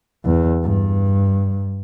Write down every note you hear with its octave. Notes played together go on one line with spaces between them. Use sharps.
E2
G2